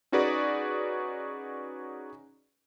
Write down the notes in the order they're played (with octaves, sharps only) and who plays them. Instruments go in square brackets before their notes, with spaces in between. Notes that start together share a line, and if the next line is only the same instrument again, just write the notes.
[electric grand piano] C#4 D#4 F#4 G#4 B4 D5